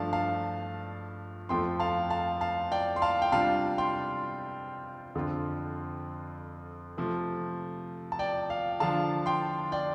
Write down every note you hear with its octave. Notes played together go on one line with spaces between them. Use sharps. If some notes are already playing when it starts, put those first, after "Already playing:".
Already playing: G2 F3 A3 D4 F5 A5
F5 A5
F2 F3 A3 C4 G5 C6
F5 A5
F5 A5
F5 A5
D5 G5
C6
F5 A5
G5
C3 G3 D4 F4 F5 A5
G5 C6
F2 D3 F3 C4 F4
C3 F3 A3
A5
D5 G5
F5
D3 F3 D4 F4 F5 A5
G5 C6
D5 G5